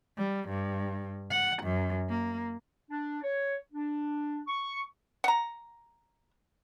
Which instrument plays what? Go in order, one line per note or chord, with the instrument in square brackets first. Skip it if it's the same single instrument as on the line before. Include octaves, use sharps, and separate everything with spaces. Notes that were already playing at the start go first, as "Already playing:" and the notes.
[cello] G3
G2
F#5
F#2
A#3
[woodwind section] D4
C#5
D4
C#6
[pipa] F#5 A#5